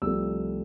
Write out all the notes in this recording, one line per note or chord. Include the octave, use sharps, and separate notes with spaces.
C2 C3 F3 A3 E6